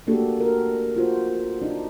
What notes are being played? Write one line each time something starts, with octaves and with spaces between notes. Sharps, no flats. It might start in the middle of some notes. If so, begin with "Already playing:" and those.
A3 A#3 D4 F#4 G4 A4
F#4 A#4
F4 F#4 C5
D4 D#4